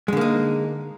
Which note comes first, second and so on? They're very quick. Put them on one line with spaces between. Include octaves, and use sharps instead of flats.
G#3 D3 A#3 D#4